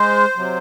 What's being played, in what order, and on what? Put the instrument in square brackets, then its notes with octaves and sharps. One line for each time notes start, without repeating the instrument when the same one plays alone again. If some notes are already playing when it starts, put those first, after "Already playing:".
Already playing: [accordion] G#3 C5
C3 F#3